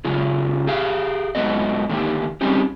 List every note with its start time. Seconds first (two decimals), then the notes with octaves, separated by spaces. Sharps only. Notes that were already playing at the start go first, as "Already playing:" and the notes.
0.05 F#2 C#3 F4 G#4
0.67 G4 G#4 F5
1.35 G#2 C#3 F#3 A3 B3 D#5
1.89 D3 D#3 A3 A#3 G4
2.41 G3 C4 C#4 D#4 G4 G#4